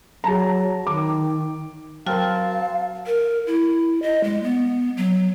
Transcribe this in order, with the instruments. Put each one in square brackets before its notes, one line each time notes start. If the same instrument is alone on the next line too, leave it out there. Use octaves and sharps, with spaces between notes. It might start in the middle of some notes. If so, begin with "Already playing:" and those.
[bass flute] F#3 [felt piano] G#4 A5 A#5
[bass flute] D#3 [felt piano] D6
[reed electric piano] F#3 A#4 [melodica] C4 A5 [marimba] F#4 G5 F6 [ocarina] F5
[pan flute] A#4
E4
D#5
G#3
B3
F#3